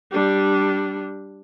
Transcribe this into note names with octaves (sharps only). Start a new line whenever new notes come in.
G3 D4